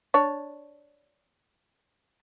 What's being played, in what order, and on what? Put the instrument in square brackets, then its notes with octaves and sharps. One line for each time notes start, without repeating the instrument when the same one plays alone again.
[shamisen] D4 C#5